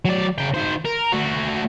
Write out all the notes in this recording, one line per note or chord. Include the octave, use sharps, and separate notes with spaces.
F#3 D5
C#3 G5
D#3 C5
A#4
A3 F#4